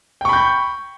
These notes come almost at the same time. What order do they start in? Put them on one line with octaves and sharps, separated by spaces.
G5 C#6 B5 G6